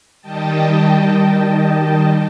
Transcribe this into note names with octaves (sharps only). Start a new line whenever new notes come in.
D#3 G3 D#5 G5 A5